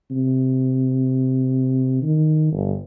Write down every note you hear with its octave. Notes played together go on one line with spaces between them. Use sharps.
C3
D#3
G1